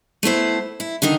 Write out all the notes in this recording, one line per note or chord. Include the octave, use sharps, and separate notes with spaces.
A3 B3 E4 C5
E4
D3 D#3 D#4 A#4